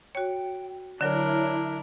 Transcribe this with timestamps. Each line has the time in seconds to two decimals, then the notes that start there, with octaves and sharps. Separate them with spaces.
0.15 F#4 C#5 G5
1.01 D3 F#3 D4 E4 A#4 C#5